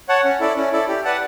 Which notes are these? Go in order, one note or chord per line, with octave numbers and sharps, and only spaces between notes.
C#5 F#5 A5
C#4
E4 A4 D5
C#4
E4 A4 D5
G4
B4 D5 F#5 A5